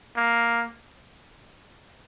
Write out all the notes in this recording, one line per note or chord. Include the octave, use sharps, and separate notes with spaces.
A#3